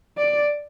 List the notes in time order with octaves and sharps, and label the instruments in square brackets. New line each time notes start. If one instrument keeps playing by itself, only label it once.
[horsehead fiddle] D5